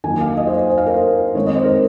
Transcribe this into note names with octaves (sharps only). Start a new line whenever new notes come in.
D#3 F#3 A#3 G#5
F5
D#5
C5
C5
D#5
F5
A#4
C5
D#3 G#3 C4 D#4 C#5
D#5
C5
A#4